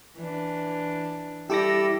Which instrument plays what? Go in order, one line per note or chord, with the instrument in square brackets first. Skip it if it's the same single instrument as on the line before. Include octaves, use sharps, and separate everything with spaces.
[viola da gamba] E3 D4
[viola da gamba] G3 [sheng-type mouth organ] E4 A4 E6 [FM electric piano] G4 D6 A#6